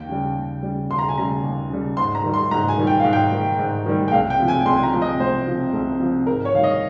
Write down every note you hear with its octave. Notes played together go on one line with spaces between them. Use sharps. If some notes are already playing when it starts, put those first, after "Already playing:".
Already playing: D#2 G5
C#3 G3
D#2
C#3 G3
D#2 C6
A#5
G#5
C#3 G3 A#5
D#2
C#3 G3
G#2 C6
A#5
D#3 G3
C6
G#2 A#5
G#5
D#3 G3
G5
G#2 F5
G5
D#3 G3
G#2
D#3 G3
G5
C2 F5
G5
C3 F3
G#5
C2 C6
G#5
A#5
C3 F3
D#5
C2 C5
C3 F3
C2
C3 F3
G#2 A#4
C#5
D#3 G3 F5
D#5